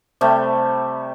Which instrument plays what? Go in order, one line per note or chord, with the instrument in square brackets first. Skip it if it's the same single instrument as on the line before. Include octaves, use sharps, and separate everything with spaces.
[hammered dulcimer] C3 G3 A3